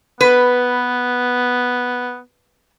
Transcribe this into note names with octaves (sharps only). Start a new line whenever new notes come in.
B3 B4